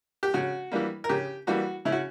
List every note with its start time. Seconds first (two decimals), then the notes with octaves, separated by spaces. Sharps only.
0.23 G4
0.34 C#3 F#4
0.72 E3 G3 A#3
1.04 A#4
1.09 C#3 G4
1.47 E3 G3 A#3 F#4
1.85 C#3 E4
1.92 F#4